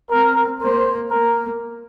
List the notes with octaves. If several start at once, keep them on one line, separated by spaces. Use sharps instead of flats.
C4 A#4
A#3 C5
A#3 A#4